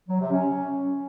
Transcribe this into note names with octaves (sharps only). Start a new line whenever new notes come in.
F#3
C3
C#4